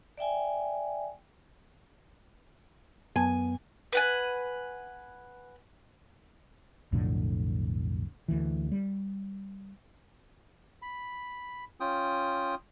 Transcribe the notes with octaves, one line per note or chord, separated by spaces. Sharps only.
D5 E5 G5 G#5
F#2 B3 G#5
B4 F#5 G#5
B1 F2 A2 D3
D2 E3
G3
B5
C#4 F4 G5 D#6